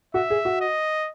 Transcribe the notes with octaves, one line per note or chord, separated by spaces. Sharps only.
F#4 E5
G#4
F#4
D#5